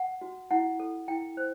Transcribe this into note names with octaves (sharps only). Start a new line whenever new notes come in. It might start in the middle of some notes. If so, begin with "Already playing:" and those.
Already playing: F#5
F#4
E4 F#5
A4
E4 G5
C5